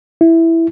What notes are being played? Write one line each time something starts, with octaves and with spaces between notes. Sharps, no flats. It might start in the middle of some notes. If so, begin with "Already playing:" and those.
E4